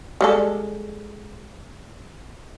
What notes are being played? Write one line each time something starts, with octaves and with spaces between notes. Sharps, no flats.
G3 G#3 A4